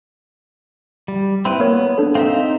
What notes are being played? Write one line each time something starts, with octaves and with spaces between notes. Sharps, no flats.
G3
C4 E4 B4 B5
A#3 B3 A#4 C#5
D4 A4
C4 D#4 E5 F5